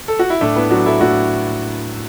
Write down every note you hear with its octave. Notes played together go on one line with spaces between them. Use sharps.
A4
F#4
E4
A2 A3 D4
B3 E4
F#3 D4 F#4
E4 A4
A2 D4 F#4